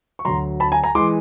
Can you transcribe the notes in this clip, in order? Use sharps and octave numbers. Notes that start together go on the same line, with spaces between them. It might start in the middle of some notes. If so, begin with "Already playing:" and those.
C#6
D2 D3 F#3 A#5 C6
A5 B5
G#5 A#5
G#5 A#5
E3 G#3 C6 D6